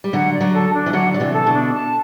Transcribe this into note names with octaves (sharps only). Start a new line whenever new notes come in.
G3
D3 F#3 F#5
D5
D3 F#3
A4
D4
E3
D3 F#3 F#5
F#3 D5
C3 E3
A4
B2 D3
D4
A5